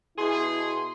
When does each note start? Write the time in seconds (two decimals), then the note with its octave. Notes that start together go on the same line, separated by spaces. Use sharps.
0.18 B2 E4 G#4 C6